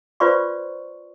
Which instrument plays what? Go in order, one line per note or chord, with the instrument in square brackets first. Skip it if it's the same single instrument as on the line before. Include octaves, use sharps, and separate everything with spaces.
[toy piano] F4 B4 C5 D5 C6 C#6